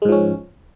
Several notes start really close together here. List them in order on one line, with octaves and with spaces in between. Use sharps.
G#3 G#2 F3 C#4